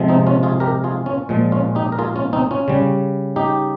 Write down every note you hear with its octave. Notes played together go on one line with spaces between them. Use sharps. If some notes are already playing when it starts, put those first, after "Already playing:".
Already playing: C3 F3 G#3
C4 D#4
C#4 F4
F4 G#4
G4 A#4
F4 G#4
C#4 F4
A#2 F3 G#3
C#4 F4
D#4 G4
A#4
F4 G#4
C#4 F4
C4 D#4
C#4 F4
C#3 G3
D#4 G4